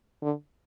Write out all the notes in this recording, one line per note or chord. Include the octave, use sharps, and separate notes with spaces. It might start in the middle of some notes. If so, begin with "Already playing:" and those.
D3